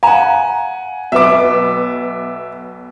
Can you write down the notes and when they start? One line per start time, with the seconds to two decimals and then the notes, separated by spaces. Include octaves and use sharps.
0.03 F5 F#5 G#5 A#5
1.12 B1 B3 E5 D6